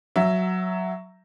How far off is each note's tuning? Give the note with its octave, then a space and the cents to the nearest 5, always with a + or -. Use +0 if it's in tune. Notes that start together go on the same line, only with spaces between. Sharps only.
F#3 +0 E5 +5